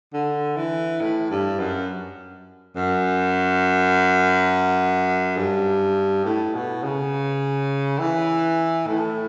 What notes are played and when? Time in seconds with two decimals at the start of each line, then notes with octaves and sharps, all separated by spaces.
0.14 D3
0.57 E3
1.01 A2
1.30 G2
1.59 F#2
2.76 F#2
5.37 G2
6.25 A2
6.54 B2
6.83 C#3
7.99 E3
8.88 A2